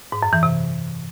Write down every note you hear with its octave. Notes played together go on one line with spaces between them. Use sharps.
G#2
F#2
E3
C3